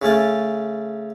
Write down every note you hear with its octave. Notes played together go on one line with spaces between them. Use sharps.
C#3 A3 C#4 A5